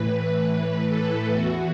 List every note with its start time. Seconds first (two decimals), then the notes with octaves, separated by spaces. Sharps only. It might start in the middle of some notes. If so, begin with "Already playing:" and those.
Already playing: A2 E3 B4
0.46 A2 E3
0.89 A4
1.32 E2 E3 F#4